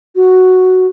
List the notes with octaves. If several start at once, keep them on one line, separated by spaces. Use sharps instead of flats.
F#4